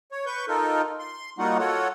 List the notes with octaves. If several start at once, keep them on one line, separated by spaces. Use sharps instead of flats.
C#5
B4 C#6 G6
D#4 F4 A4 A#4
C6
G3 A#3 D#4 F4 F#4 F#5
F4 F#4 A4 C#5 F#5